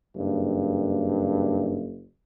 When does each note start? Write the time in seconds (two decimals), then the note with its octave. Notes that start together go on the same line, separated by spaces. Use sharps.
0.16 F#1 G2